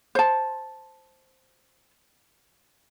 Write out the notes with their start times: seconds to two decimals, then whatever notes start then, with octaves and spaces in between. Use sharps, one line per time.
0.15 C5 A5